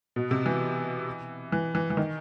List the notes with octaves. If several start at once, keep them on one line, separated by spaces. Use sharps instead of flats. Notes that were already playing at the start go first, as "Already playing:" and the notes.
B2
C3
E3
E3
E3
E3
D#3